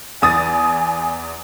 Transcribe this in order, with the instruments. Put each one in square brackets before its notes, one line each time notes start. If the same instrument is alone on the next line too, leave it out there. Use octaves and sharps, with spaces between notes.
[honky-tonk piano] E2 D#6 A6 [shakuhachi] G#5